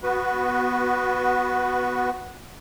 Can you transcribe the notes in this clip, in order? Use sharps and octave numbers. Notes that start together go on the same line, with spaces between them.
B3 F#4 B4